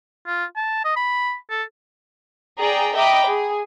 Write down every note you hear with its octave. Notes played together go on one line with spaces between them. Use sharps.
F4
A5
D#5
B5
A4
G#4 D5 G5 A#5
D#5 E5 G5 A#5 B5 D6
G#4